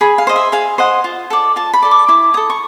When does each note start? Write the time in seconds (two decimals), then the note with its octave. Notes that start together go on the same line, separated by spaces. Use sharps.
0.01 G#4 B5
0.18 F5
0.27 C5 D#5
0.36 E5
0.52 G#4 F5
0.78 C5 D#5 F#5
1.04 F4
1.30 A4 D5
1.56 F4 A5
1.74 B5
1.82 A4 D5
1.91 D6
2.08 E4 D6
2.34 A4 C#5 D#6
2.50 C#6